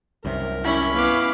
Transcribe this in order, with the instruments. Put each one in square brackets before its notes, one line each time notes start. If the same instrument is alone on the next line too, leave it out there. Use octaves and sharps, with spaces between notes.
[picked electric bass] C2 F#2 C3 [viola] A#4
[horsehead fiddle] C#4 B5 [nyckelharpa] E4 G4
[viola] B3 E4 [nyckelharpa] F5 D6